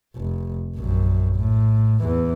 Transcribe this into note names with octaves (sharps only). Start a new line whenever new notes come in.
F1
A#1 F#2
A2
E2 E3